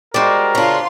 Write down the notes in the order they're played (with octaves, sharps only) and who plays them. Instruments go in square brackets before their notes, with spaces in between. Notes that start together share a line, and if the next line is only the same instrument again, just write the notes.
[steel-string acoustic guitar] G3 G#3 [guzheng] F#4 C5 D5 [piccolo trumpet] A#4
[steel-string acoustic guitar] C#3 D4 [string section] F4 C6